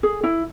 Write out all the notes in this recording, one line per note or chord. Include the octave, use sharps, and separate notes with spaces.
G#4
E4